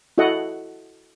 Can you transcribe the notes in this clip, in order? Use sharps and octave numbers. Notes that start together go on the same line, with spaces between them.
E4 F#4 A4 D#5 F#5